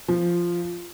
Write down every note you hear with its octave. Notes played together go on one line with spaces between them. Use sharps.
F3